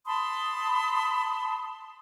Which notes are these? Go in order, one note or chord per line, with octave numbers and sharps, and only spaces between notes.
A5 B5 C6 D#6